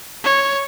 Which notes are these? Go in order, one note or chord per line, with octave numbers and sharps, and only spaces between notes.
C#5